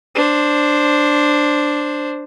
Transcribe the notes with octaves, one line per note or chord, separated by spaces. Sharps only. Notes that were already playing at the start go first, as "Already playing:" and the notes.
D4 C5